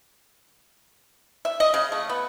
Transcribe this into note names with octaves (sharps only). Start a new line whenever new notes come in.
E5
D#5
C#3
A3
B3